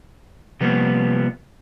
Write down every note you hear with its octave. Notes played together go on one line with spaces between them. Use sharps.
C3 F3 G3 A#3 B3